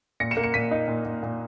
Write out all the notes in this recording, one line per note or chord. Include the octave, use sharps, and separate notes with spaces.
A#2 A#6 C#7
C#7 E7
A#3
C#7 E7
A#2 B6 D#7
D#4
A#2
A#2
A#2